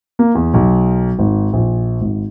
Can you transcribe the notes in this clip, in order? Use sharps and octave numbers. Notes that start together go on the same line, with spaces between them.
A#3
E2
B1
G#1
A#1
G#1